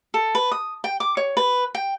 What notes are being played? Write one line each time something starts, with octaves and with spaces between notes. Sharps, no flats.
A4
B4
D#6
G5
D6
C#5
B4
G5